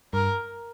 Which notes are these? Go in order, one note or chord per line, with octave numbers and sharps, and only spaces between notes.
G2 A#4